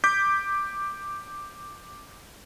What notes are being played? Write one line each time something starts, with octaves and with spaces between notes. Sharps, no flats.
D6 G6 B6